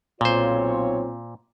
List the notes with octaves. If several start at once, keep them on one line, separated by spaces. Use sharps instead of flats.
B1 A#2 C4 F4 C5 C#5